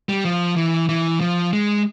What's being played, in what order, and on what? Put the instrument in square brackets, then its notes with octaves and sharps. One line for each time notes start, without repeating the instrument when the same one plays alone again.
[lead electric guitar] G3
F3
E3
E3
F3
G#3